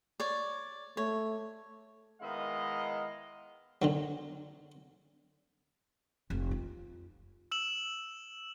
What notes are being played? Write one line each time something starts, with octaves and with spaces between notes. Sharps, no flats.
C#5 D5
A3 C#5
D#3 G#3 B3 E4 D#5 F5
D3 D#3 F#3
F1
F4
E6 E7 F#7